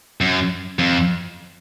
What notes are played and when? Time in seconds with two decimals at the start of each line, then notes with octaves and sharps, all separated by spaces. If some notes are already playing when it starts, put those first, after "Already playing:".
0.21 F#2
0.79 F2